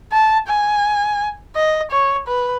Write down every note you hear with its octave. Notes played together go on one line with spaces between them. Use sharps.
A5
G#5
D#5
C#5
B4